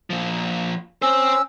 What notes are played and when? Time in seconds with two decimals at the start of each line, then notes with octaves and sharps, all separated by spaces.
0.10 A#2 F3
1.02 C4 C#4 C5 E6